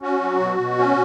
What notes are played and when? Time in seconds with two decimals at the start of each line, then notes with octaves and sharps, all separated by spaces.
0.02 C#4 F#4
0.22 F#3
0.40 B2
0.59 B2
0.79 C#4